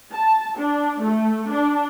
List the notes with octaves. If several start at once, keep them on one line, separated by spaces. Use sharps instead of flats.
A5
D4
A3
D4